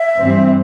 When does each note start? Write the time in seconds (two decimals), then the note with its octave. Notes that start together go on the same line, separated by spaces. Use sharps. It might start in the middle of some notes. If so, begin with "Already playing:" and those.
Already playing: E5
0.19 G2 E3 G3 C4